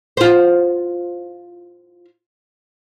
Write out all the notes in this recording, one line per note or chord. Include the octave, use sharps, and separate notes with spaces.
F4 C5